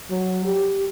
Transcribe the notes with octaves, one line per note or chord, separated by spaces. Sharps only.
F#3
G4